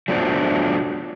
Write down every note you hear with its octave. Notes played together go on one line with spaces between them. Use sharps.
F#3 A3 B3 D4 F4 C5